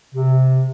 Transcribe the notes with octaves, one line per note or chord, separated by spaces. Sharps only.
C3